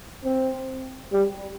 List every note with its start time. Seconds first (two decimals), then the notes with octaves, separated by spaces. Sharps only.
0.24 C4
1.13 G3